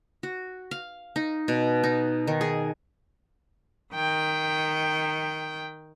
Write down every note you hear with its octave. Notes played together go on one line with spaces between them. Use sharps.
F#4
F5
D#4
B2
D#4
D#3
G#4
D#3 G5